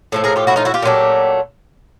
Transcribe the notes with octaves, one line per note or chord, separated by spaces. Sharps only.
A2 F3 A3
G#4 A#4
F4 G4
E4 F#4
D#4 F4
E4 F#4
F4 G4
A#2 F#3 A3